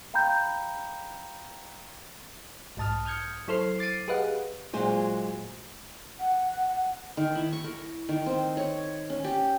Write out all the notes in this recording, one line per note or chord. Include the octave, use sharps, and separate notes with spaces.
F5 G5 A#5 B5 G6
B1 G#2 A5 D#6 F6
D#6 F6 G6 G#6 C#7
F#3 E4 A4 C5 F6 C7
D6 A6 C7 D7 D#7
G4 G#4 B4 D#5 F5 F#5
A#2 F#3 G#3 C5 G#5
F#5
D#3
E4
C#6
A#4
D#3
C4
C#5
C#4
G4